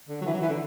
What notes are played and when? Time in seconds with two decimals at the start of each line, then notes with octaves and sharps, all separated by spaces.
0.09 D3
0.21 F#3
0.26 E3
0.34 F#3
0.42 E3
0.50 D3